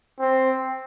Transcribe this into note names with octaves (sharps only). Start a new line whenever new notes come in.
C4